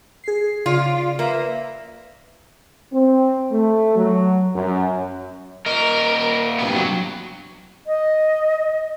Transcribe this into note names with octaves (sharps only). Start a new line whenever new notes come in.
G#4 C7
C#3 F4 D5
A#3 B4 E5 A#5
C4
A3
F#3
F#2
A#2 A#4 D#5
G2 C3 B3
F#3
D#5